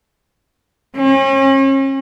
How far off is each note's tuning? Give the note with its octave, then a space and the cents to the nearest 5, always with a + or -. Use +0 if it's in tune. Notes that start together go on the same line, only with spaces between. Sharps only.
C#4 -40